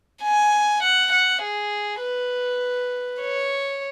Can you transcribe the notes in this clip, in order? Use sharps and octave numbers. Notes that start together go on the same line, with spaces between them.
G#5
F#5
F#5
G#4
B4
C#5